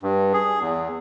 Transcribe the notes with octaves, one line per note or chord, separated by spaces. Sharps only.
G2
G#4
E2